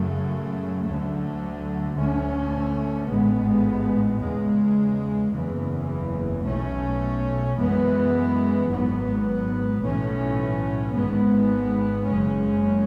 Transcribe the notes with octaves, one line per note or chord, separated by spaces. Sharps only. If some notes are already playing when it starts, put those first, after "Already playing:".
Already playing: F#2 C#3 F#3 A3
D2 D3 F#3 A3
D2 D3 A3 C#4
A1 G#2 G#3 B3
E2 C#3 G#3
F#1 E2 C#3 E3
B1 B2 A3 C#4
F#2 E3 G#3 B3
G#1 G#2 F#3 B3
B1 A2 E3 A3 C#4
G#1 G#2 G#3 B3
F#1 F#2 C#3 G#3 C#4